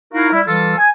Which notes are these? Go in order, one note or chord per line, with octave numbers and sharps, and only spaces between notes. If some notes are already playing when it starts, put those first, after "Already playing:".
D#4 E4 F#4 A#4 F5
G3 E4
E3 G3 F4 A4
G#5